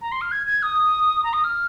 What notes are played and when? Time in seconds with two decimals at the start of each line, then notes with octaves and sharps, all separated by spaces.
0.02 A#5
0.12 C6
0.21 F6
0.32 G#6
0.47 G#6
0.63 D#6
1.24 A#5
1.33 D#6
1.44 F6